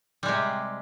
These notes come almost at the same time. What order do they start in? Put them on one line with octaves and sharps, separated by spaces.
G3 G#3 C3